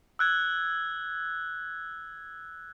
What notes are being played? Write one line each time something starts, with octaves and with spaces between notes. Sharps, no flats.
E6 F#6 G#6